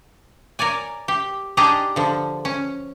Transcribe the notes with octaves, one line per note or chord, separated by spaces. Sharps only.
A#4 C#5 D5 G#5
G4
D4 D#4 G4 G#4 D#5 A#5
D3 F3
C#4